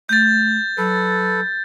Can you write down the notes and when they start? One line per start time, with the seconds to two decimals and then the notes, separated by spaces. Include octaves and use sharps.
0.09 A3 G6 A6
0.78 F#3 A4 B4